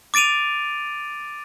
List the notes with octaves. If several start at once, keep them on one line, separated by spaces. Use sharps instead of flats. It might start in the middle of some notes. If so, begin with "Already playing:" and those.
D6 A6 D7 D#7 F7